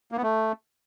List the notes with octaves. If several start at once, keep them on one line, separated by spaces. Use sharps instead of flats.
A#3
B3
A3